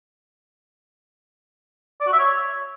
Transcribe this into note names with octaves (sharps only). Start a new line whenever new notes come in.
D5
F#4
E5
C#5